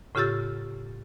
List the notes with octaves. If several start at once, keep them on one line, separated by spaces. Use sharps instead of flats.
A2 C#3 F4 G4 E6 A6